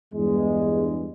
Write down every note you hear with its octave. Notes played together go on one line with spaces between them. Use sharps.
E2 G2 G#3